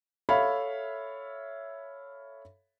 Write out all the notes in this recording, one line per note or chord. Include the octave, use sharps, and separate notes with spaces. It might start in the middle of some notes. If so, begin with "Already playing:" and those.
A4 C#5 E5 F5 B5